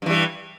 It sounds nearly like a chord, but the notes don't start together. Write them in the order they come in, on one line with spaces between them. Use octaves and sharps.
G2 E3 G3